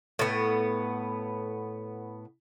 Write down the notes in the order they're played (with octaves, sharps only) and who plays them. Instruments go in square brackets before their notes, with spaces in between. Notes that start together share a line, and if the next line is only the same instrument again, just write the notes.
[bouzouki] A2 B3